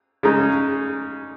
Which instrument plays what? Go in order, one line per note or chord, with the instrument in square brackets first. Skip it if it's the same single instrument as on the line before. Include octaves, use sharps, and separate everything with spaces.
[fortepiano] C#3 G#3 D#4